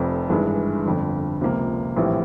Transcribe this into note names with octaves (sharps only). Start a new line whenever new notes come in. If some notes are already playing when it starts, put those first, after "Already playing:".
Already playing: F1 F2 C3
G#1 G2 E3 G#3
G1 F2 D3
C#2 C3 F3 A#3
A#1 A2 E3 G3 C4